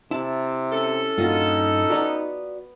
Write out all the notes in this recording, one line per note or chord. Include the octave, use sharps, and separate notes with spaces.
C3 E4 A5
C#4 A4
G2 A#2 D#4 F4 F#4 D#5
B3 F#4 B4 D5 A#5